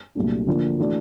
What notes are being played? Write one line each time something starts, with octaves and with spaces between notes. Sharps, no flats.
C2 A#2 F#3 A3 D4
D3 F3 A#3 D4
E3 A3 D4 F#4